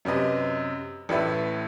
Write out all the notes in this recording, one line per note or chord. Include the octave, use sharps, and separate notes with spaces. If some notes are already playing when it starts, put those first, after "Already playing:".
F#2 C3 B4 D#5
A1 A2 B4 E5